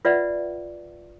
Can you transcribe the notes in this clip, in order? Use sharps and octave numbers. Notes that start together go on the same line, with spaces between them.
F4 B4 D5 E5 F#5